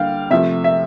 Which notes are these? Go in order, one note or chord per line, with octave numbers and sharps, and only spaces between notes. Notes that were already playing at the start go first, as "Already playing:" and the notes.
Already playing: D3 G3 A#3 F5 G5
C3 F3 A3 E5
E5